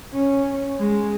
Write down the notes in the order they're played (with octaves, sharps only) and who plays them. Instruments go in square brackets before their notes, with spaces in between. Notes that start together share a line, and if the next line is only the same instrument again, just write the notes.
[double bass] C#4
G#3